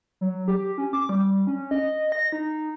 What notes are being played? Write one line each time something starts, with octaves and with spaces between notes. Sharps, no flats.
F#3
G4
C#4
D6
G3
C#4
D#5
A#6
D#4